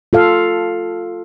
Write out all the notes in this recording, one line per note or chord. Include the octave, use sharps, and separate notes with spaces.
F4 A4 F5